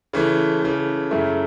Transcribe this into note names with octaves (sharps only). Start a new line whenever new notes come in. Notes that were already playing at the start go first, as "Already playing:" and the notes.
C#3 E3 A3
C#3 E3 A3
F#2 C#3 A3 E4